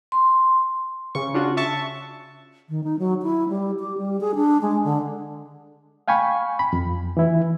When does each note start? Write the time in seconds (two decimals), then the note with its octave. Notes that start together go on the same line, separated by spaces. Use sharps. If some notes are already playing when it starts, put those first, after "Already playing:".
0.12 C6
1.15 C#3 C#6
1.34 D4 F4 F#4
1.57 E5 A5 C#6
2.69 D#3
2.84 D#4
2.99 F#3
3.23 E4
3.49 G3
3.79 G4
3.98 G3
4.21 G#4
4.35 D4
4.62 G#3
4.84 D3
6.08 F5 G5 G#5 B5 C#6
6.59 B5
6.73 F2
7.17 E3 E4